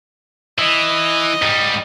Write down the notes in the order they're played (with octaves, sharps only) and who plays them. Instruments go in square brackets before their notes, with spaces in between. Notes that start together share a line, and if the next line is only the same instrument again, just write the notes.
[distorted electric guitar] E3 [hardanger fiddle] D#5
[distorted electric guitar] G#2 G3